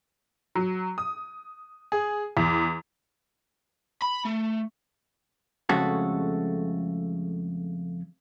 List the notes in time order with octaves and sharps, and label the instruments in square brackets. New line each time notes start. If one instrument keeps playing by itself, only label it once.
[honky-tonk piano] F#3
D#6
G#4
E2
[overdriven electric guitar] B5
A3
[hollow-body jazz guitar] F2 C#3 G#3 A3 F#4 A4